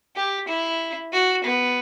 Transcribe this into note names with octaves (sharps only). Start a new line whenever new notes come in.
G4
E4
F#4
B3